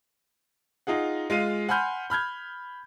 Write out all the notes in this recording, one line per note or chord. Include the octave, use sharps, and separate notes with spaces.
D#4 F4 G#4 F#5
G#3 F4 F5 D#7
F#5 G#5 B5 C6 F6 G6
B5 F6 G6 G#6